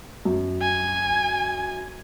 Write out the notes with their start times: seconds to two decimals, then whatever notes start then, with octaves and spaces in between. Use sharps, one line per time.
0.25 F#2
0.62 G#5